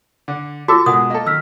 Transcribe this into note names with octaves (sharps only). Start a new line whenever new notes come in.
D3
F4 F#4 A4 D6 E6
B2 G#3 A#4 F#5 D#6
A#3 F4 A4 D#5
D#3 E6 F6 B6